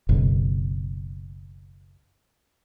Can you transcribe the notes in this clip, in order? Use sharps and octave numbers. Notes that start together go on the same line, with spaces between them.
F#1 B1